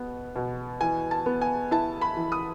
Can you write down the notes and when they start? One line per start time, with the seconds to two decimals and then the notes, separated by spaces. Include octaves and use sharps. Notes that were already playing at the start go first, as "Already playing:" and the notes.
Already playing: B2 B3
0.36 B2
0.81 E3 G#5
1.11 A5
1.26 B3
1.41 G#5
1.71 E4 A5
2.01 B5
2.17 E3
2.32 D#6